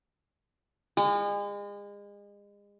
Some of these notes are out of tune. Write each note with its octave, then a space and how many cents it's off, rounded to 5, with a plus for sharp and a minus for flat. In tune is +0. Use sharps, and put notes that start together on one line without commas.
G#3 -35